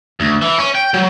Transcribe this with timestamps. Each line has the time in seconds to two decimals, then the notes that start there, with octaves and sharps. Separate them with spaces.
0.20 D2
0.42 E3
0.59 C#4
0.75 G5
0.94 F#3